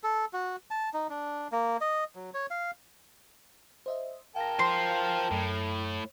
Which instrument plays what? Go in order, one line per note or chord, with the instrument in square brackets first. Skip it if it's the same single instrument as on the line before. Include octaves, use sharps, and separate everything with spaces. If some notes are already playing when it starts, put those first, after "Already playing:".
[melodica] A4
F#4
A5
D#4
D4
A#3
D#5
F#3
C#5
F5
[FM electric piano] C5 D#5 E5
[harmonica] A#4 G5 A5 [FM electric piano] F5 A#6
[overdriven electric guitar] F4 C5 [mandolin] C6
[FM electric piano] F#2 [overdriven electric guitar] A2